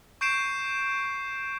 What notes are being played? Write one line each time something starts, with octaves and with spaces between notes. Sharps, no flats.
C#6 G6 C7 D7 E7